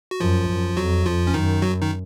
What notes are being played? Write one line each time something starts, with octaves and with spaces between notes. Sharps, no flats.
F#4
F#2 F3 F4
F#2
F2 F#3 F#4
F2 F3 F4
C#4
F#2 D#3 D#4
F#3 F#4
D#3 D#4